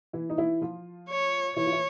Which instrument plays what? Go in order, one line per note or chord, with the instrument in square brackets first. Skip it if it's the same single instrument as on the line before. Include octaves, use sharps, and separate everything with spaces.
[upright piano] E3 E4
D#4
E3 E4
F3 F4
[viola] C#5
[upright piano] E3 E4 [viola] C#5
[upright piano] F4
E4